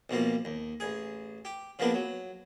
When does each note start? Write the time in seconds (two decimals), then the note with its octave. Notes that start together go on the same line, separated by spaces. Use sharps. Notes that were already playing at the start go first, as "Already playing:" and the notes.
0.10 B1 B2 F3 A#3
0.45 D#2
0.80 A1 G#4
1.45 G4
1.79 C#3 F3 A#3 B3 D4
1.94 F#3